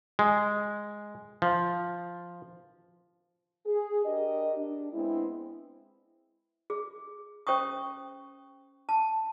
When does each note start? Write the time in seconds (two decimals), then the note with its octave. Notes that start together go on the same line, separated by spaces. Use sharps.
0.19 G#3
1.42 F3
3.66 G#4
4.05 D4 G4 A#4 D#5
4.57 D4
4.93 G#3 B3 C4 E4
6.70 G#4
7.47 C#4 C5 G5 C#6 D#6
8.89 A5